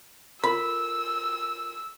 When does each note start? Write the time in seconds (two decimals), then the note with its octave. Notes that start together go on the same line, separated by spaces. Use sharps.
0.44 F4 A4 A#4 B5 E6